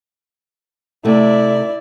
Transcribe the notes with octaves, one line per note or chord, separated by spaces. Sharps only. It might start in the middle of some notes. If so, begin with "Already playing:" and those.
C3 A3 E4 D5